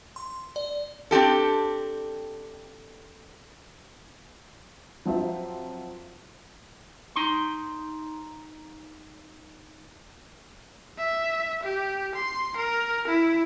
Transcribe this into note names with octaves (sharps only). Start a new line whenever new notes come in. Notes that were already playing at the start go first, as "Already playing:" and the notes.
C6
D5
C4 D4 G4 A4
F3 F#3 C4 F4 C5 E5
D#4 C6
E5
G4
C6
A#4
E4